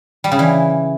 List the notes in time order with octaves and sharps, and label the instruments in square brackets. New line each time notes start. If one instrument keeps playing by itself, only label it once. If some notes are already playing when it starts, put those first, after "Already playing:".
[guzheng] G3
C#3
E3